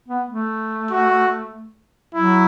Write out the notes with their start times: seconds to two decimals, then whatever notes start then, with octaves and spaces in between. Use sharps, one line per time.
0.08 B3
0.29 A3
0.91 F#4
2.14 F#3 E4